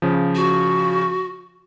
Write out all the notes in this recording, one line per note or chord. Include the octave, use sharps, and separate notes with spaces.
C#3 F3
F#4